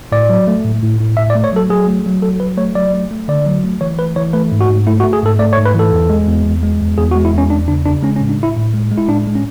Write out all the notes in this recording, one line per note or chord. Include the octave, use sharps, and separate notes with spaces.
A2 D5
F#3
A3
A2
A2
A2
A2 E5
D5
A3
C#5
F#3 A4
F#3 G#4
A3
F#3
F#3 A4
F#3 B4
A3 C#5
F#3 D5
A3
A3
D3 D5
F#3
A3
E3 C#5
A3 B4
E3 C#5
A3 B4
G#2
F#4
G#2
A3 E4
F#4
A3
G#4
G#2 A4
A3 D5
C#5
G#2
B4
E3 A4
E2
G#3
E2
E2
G#3
E2
E2 G#4
F#4
G#3
E4
E2 C#4
E2 D4
C#3 D4
C#3 D4
G#3 C#4
C#4
A2
D4
A2
E4
A2
G#3
G#3
E4
A2 D4
G#3
C#4